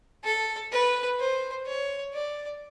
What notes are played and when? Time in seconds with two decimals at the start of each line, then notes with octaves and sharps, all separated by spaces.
0.24 A4
0.72 B4
1.19 C5
1.67 C#5
2.14 D5